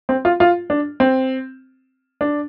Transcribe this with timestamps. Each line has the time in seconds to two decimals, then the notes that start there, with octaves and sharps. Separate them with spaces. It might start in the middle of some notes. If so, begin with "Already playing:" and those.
0.09 C4
0.25 F4
0.40 F4
0.70 D4
1.00 C4
2.21 D4